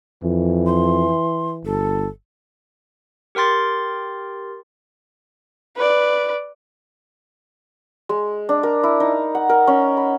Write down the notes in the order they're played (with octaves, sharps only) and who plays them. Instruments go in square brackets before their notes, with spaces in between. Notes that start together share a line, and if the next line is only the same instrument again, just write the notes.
[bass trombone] F2 [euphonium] E3
[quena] C6
[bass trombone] G1 [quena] A4
[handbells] G4 A#4 G5 C6 A6
[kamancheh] B4 D5
[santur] G#3
D4
A#4
E4
D#4
F#5
A#4
C#4
B5